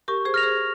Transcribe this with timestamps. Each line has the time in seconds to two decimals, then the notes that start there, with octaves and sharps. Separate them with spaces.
0.08 G4 A#4 C#6
0.25 G#4 C5
0.34 F6 A#6 F7
0.43 G#4 C5